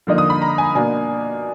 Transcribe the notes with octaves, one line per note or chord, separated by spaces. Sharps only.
D3 F3 A#3 D#4
D#6
B5
A#5
G#5
B2 A#3 D4 G#5